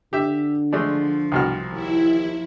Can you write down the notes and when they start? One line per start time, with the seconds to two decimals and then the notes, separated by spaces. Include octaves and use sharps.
0.13 D3 G4 E5
0.73 F3 G#3 A3 D4
1.32 C2 B2 F6
1.72 D#2 E4